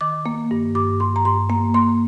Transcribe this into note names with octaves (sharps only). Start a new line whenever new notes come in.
D#3 D6
A#3
G2
G2 D6
G2 C6
A#5
G2 C6
A#3 A#5
A#3 C6